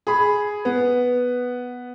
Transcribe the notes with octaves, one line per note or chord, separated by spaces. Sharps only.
G#4 B5
B3